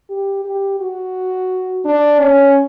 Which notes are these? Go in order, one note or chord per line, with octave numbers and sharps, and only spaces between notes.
G4
G4
F#4
D4
C#4